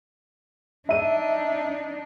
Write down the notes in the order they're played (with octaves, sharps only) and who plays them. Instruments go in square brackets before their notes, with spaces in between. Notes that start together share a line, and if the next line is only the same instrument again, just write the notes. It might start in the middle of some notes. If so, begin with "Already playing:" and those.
[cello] D4 D#4 [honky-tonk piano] E5 D#7